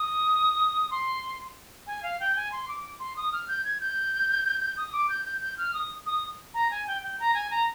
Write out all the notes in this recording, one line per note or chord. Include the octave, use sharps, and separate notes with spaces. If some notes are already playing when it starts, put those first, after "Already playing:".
Already playing: D#6
C6
G#5
F5
G5
G#5
C6
D6
C6
D#6
F6
G6
G#6
G6
D#6
D6
G6
G6
G6
F6
D#6
D#6
A#5
G#5
G5
G5
A#5
G#5
A#5